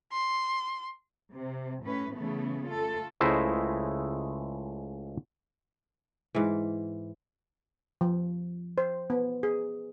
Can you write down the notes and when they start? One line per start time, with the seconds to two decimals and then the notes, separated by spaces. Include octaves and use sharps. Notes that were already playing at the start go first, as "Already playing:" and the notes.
0.12 C6
1.34 C3
1.84 A2 C#4 B4
2.18 C#3 E3 A3 B3
2.68 A3 F4 A4
3.20 C#2 G#3 A3 E4 C5 D#5
6.35 G#2 E3
8.01 F3
8.78 C5
9.10 B3
9.43 G#4